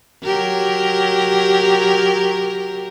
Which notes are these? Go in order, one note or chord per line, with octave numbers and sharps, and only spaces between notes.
F#3 G4 A#4